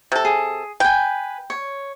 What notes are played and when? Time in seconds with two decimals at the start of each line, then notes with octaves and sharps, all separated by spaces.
0.12 C3 A4
0.25 G#4
0.80 B4 G5 G#5
1.50 C#5